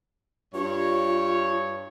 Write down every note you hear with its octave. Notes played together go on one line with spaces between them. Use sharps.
G2 F4 C#5